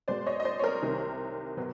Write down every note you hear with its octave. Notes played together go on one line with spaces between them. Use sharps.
B2 G#3 B3 C5 D5
C#5 D#5
D#5
C5 D5
C#5
A#4 C5
C2 C3 D#3
B2 F#3 B3